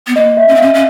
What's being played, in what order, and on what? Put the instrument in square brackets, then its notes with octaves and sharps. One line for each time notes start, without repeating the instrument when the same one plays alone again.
[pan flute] B3
[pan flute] A#3 [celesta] D#5
[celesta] E5
[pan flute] C#4
C4
[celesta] F5
[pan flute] C#4
C#4